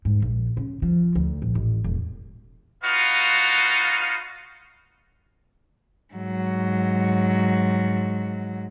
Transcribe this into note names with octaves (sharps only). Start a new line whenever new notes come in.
G#2
A#1
C#3
F3
D2
A#1
A1
E1
D#4 F4 F#4 B4 F5
G#2 F#3